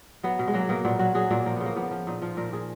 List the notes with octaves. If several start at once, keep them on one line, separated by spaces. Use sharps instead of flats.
F#3 B3
B2
G#3
F#3 A#3
B2 A#3
A#2 B3
F#3 F#4
F#3 G#4
A#2 A#3
F3 A#3
C#3 B3
A#3
F3 B3
F3
A#2 D#4
F3 F4
A#2 A#4
A#2 G#4